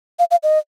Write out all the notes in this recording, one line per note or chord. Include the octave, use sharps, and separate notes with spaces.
F5
F5
D#5